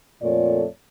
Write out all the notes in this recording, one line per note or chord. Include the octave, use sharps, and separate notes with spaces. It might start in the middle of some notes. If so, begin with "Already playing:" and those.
F2 A#2 A3 C#5 D5